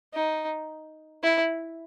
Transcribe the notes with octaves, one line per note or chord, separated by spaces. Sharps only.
D#4
E4